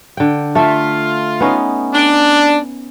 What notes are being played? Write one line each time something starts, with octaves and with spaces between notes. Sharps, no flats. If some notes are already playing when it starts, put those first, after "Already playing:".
D3 G5
A3 F4 E5
B3 C#4 D#4
D4